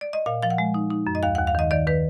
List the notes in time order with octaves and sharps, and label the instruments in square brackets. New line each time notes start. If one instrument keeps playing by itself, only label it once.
[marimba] D5
D#5
A#2 F5
F3 F5
F#5
G#3
D#4
D#4
F#2
D#5
D#2 F5
D#2 F#5
F5
D#3 D#5
D#3 D5
D#3 B4